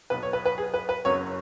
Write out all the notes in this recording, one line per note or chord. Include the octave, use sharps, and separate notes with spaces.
B1 B2 F#3 B4
C#5
B4
B4
G#4
B4
B4
F#1 F#2 F#3 C#5